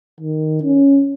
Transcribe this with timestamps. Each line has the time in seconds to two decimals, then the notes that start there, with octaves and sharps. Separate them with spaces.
0.20 D#3
0.63 C#4